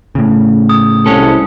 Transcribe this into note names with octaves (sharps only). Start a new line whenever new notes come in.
A2 C#3
D#6
C2 G#3 C#4 A4